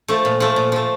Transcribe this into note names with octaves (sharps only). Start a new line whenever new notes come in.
F3 A3
A#2
F3 A3
A#2
F3 A3